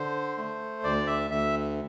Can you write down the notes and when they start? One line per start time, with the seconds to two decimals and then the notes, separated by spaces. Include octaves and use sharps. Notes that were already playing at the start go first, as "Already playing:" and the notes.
Already playing: D3 C5
0.37 A3
0.84 D2 D5
1.07 E5
1.31 D2 E5